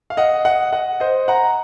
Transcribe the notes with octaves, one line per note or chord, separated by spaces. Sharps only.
F5
D#5 F#5
D#5 F#5
D#5 F#5
C5 D#5
F#5 A#5